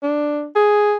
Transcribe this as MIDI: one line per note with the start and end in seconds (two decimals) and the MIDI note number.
0.03 0.46 62
0.55 0.97 68